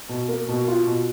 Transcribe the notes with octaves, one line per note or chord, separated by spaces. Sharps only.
B2
A#3
B2
F4
B2